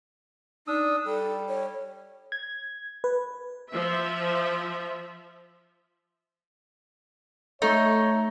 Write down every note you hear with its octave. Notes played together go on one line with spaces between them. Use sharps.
D4 D#4 D#6 E6
G3 A4
C#5
G#6
B4
F3 E5
A3 D#4 A4 C#5